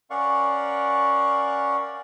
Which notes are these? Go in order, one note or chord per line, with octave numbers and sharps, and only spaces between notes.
C#4 A#4 D5 F5 F#5 C#6